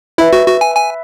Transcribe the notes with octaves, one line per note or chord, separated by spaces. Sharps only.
E4 B4 E5
F#4
F#4
G#5
G#5